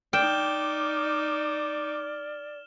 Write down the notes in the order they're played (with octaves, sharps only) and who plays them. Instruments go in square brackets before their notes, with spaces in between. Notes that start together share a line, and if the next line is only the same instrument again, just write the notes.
[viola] D#4 D6 [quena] D5 [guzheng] G5 [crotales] F6 E7 G7